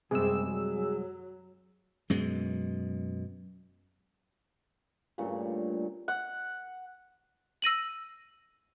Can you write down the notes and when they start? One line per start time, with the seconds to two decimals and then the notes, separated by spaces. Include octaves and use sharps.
0.11 F#2 C3 G3 G#3 C4 G#4 E6
0.48 F#3
2.10 F#2 B2 G#3
5.18 G2 A#2 C#3 A3
6.08 F#5
7.62 E6 A#6 D#7 F#7